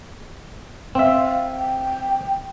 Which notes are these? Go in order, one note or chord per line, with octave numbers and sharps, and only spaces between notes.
C4 E5 F5
G5